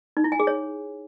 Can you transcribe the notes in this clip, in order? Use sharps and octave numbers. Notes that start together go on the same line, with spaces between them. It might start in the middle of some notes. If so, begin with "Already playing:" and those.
D#4
E4
G#5
G#4
C#5